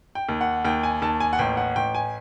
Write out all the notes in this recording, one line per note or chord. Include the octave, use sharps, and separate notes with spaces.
G5
D#2
F#5
D#2 G5
G#5
D#2 A5
G#5
F#5
A1 G5
F#5
A1 G5
G#5